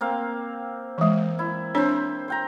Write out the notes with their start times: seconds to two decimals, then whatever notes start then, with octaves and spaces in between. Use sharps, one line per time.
0.01 A#3 C4 F5
0.98 E3 G#3
1.39 E4
1.74 C4 D4 C5 C#5 E5
2.28 C5 G5 A#5